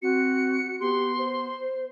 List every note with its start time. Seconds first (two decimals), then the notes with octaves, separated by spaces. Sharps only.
0.02 C4 F#4 C#7
0.80 B3 G4 C6
1.18 C5